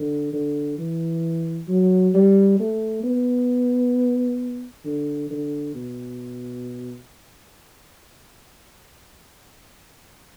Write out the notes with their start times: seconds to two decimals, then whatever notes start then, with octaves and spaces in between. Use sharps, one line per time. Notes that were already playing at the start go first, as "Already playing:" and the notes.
Already playing: D3
0.33 D3
0.78 E3
1.68 F#3
2.14 G3
2.59 A3
3.03 B3
4.85 D3
5.30 D3
5.74 B2